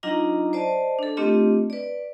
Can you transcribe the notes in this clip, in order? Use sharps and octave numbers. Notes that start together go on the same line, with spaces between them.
F#3 D4 D#4 F4 D#5 A#5
C5 D5 D#5 A5
D4 A4
A3 C4 D4 F4 G4 D#5
B4 D5